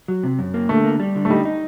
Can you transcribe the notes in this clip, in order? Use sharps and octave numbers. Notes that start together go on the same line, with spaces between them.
F#3
C3
F#2
A#3
D3 A3
A#3
G3
D3
A3
G3 D#4
D#4